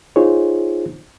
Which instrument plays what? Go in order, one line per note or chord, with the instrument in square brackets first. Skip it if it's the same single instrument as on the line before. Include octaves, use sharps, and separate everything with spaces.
[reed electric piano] D#4 F4 G#4 C5 C#5